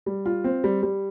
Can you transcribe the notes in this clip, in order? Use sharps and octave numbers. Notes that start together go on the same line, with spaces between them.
G3
F4
C4
G3
G3